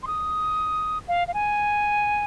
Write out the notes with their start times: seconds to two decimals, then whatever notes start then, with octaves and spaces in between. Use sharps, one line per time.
0.03 C6
0.07 D#6
1.08 F5
1.28 F5
1.34 G#5